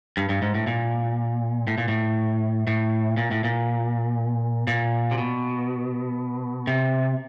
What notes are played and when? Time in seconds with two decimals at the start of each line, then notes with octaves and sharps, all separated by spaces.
0.17 G2
0.29 G2
0.42 G#2
0.55 A2
0.67 A#2
1.67 A2
1.78 A#2
1.88 A2
2.67 A2
3.17 A#2
3.31 A2
3.44 A#2
4.67 A#2
5.11 C3
5.18 B2
6.67 C3